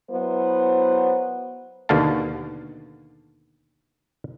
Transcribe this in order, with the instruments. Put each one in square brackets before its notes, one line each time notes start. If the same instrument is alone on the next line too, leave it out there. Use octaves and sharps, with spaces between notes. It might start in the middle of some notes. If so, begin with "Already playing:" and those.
[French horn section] F#3 B3 E4 C5
[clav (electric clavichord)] D#2 B2 D3 F5 A5